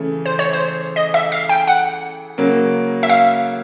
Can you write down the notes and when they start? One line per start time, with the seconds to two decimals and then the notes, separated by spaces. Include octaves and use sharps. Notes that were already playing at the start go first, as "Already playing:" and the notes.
Already playing: C#3 E3 A3
0.26 C5
0.39 C#5
0.53 C5
0.96 D#5
1.14 E5
1.32 F5
1.49 G5
1.68 F#5
2.38 C#3 F#3 A#3
3.03 E5
3.09 F5